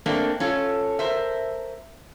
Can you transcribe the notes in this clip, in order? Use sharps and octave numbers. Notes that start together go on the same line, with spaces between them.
A3 A#3 C4 D4
C#4 F4 A4
A#4 C5 E5